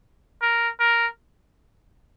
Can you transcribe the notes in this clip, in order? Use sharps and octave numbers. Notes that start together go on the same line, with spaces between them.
A#4
A#4